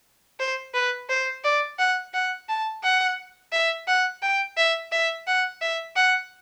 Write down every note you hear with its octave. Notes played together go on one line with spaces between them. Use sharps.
C5
B4
C5
D5
F#5
F#5
A5
F#5
E5
F#5
G5
E5
E5
F#5
E5
F#5